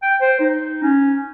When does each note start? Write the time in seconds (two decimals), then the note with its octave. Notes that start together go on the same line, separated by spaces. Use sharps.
0.03 G5
0.21 C5
0.40 D#4
0.83 C#4